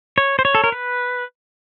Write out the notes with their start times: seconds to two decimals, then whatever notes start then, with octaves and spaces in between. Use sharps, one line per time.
0.18 C#5
0.39 C5
0.45 C#5
0.55 A4
0.64 A#4
0.72 B4